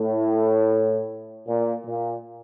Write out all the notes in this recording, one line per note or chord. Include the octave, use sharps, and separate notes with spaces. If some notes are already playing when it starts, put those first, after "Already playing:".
Already playing: A2
A#2
A#2